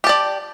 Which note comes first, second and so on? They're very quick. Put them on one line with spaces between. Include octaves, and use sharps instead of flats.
G4 A5 D5